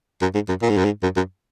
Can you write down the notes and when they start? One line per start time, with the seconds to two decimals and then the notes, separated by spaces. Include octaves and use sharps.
0.22 F#2
0.34 G#2
0.49 F#2
0.62 A#2
0.70 G#2
0.77 F#2
0.85 G#2
1.03 F#2
1.16 F#2